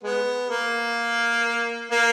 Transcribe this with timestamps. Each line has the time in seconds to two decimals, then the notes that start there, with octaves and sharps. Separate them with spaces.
0.03 G#3 B3
0.50 A#3
1.91 A#3